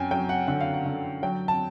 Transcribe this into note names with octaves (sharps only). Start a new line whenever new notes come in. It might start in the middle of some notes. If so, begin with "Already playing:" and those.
Already playing: F#2 G5 G#5
F#3 G5
F#5
D3 F#5
F5
F#5
D3
F#3 G5
A5